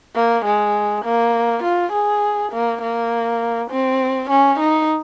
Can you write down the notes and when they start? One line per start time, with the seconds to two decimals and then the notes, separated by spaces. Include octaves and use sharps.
0.15 A#3
0.45 G#3
1.05 A#3
1.63 F4
1.93 G#4
2.52 A#3
2.82 A#3
3.71 C4
4.30 C#4
4.59 D#4